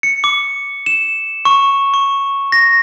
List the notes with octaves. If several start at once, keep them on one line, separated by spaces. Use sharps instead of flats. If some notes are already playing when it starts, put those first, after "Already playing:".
C#7
D6
E7
C#6
C#6
A#6